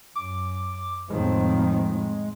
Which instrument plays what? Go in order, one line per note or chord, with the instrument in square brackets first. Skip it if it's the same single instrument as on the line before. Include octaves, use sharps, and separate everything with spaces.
[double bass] F#2 [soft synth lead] D6
[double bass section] F2 F3 C4 [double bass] A2 D#3 [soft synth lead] G#3